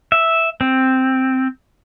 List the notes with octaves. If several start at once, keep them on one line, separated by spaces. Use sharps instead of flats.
E5
C4